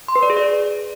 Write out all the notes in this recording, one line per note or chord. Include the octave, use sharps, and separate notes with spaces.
C6
B4
D5
G#4
D5